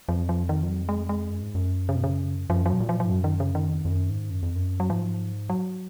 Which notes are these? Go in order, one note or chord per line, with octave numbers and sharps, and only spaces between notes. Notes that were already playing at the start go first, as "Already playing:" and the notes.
F2 F3
F3
D#3
F3
F#3
G#3
G#3
F#2
G#2
F#2
C#3
B2
C#3
F#2 F3
F3
B2 F#3
A#2
F3
F3
G#2
F#2 F#3
D#3
C#3
D#3
F2
F2
F#2
G#2
F#2
F2
F#2
F#3
G#2 F3
F#3